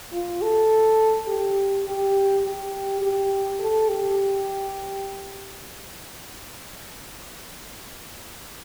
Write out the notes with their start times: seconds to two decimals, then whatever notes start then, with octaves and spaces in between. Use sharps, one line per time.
0.12 F4
0.42 A4
1.28 G4
1.86 G4
2.45 G4
3.02 G4
3.60 A4
3.89 G4